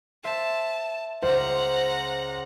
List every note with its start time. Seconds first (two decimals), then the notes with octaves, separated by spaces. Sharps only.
0.24 C5 E5 A5
1.23 C#2 C5 F#5 A#5